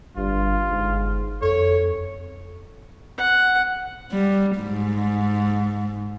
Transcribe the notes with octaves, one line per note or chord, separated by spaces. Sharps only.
G1 G2 F4
G1 G#2
F2 A4 C#5
F#5
G3
G#2